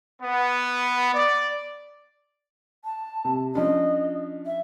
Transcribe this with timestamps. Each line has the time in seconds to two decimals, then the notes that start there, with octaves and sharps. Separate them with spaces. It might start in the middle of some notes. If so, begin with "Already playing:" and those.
0.22 B3
1.13 D5
2.85 A5
3.25 C3
3.55 F3 C#4 D4 D#5
4.46 E5